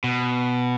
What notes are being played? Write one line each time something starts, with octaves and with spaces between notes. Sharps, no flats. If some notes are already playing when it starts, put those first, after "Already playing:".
B2